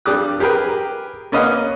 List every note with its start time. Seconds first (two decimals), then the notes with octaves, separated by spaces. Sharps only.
0.06 G2 G3 G4 D6 D#6 F#6
0.40 G4 G#4 A#4 B4 G5
1.32 A#3 C#4 B4 D#5 F5 F#5